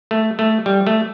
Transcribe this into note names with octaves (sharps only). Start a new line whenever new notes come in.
A3
A3
G3
A3